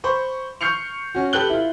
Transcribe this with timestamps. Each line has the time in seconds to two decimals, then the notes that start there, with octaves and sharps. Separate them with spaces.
0.04 C5 B5 C#6
0.61 C#6 F6 G6 C7 C#7 F7
1.15 C#4 F#4
1.33 G4 A4 B4 F#6 G7
1.50 E4 F4